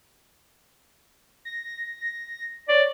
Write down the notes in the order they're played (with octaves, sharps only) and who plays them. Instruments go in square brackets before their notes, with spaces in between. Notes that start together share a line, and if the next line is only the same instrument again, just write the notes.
[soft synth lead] A#6
[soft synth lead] C#5 [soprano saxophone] D5